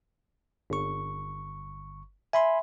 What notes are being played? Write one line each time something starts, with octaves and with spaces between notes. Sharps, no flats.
G1 C#6
E5 G#5 B5 C6